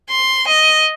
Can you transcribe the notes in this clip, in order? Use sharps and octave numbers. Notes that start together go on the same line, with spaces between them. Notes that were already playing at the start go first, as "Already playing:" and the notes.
C6
D#5